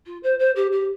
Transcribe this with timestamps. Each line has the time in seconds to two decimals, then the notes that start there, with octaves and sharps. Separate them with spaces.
0.06 F4
0.23 C5
0.39 C5
0.55 G4
0.72 G4